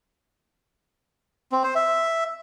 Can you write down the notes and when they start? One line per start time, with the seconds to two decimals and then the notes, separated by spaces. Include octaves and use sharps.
1.52 C4
1.64 C5
1.75 E5